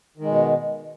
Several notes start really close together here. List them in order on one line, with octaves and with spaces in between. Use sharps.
D#3 G#3 B2